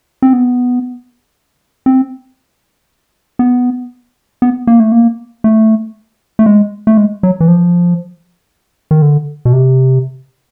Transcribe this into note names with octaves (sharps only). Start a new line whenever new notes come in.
C4
B3
C4
B3
B3
A#3
A3
A#3
A3
A3
G#3
A3
G#3
F#3
E3
F3
D#3
D3
B2
C3